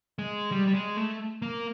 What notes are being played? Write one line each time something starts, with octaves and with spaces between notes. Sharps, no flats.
G#3
G3
G3
G#3
A3
A#3